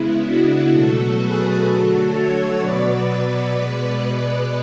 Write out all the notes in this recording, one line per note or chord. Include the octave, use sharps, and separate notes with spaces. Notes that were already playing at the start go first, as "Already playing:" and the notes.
Already playing: C#3 G#3 B3 E4
D4 F#4
B2 F#3 A3 F#4 A4
G#4 B4
D3 F#3 A3 F#4 A4
A4 C#5
B2 F#3 B3 B4 D5
B2 G#3 B3
B4 D5